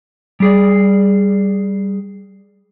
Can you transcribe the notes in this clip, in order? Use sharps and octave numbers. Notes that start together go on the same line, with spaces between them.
G3 G#4 D5